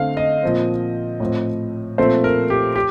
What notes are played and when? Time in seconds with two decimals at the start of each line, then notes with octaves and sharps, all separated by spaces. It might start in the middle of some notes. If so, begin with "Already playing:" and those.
Already playing: D3 A3 C4 F5
0.17 D#5
0.43 A#2 F3 C4
1.20 A2 F3 C4
1.98 A#2 F3 A3 C4 C5
2.24 A#4
2.50 G4
2.76 G4